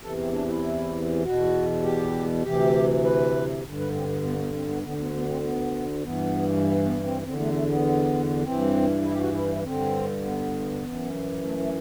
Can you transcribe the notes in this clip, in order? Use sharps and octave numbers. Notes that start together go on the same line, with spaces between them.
E2 C3 E3 A4
C4
D4
E4
E2 B2 F#4
G4
D2 C3 E3 G4
B4
G2 D3
B4
C4
B3
B3
B3
C4
B3
D2 D3 B3
B3
B3
C4
B3
G2 E3 B3
B3
B3
C4
E2 D3 C4
A3
A3
B3
G2 E3 C4
E4
G4
F#4
E4
E4
G2 D3 C4
B3
F#2 E3
A3
A3